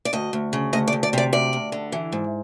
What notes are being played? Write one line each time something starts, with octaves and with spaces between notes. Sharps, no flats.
D5
D2 D#5
D2
C#3
D2 D#5
D5
D2
D5
C3 D5
D2 D5
D2
D3
E3
G#2